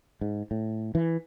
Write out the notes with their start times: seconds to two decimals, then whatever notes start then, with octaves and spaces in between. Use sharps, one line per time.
0.21 G#2
0.51 A2
0.95 E3